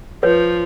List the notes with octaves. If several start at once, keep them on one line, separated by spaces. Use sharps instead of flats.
F3 B4 C#5